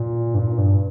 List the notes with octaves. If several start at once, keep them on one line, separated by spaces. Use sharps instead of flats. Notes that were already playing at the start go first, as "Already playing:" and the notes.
Already playing: A#2
G2
A#2
G2